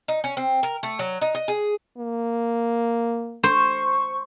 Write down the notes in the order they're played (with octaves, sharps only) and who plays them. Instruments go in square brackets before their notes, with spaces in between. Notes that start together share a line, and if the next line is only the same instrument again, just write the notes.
[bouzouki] D#4
C#4
C4
A#4
A3
F#3
D#4
D#5
G#4
[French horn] A#3
[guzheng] C5 [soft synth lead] C#6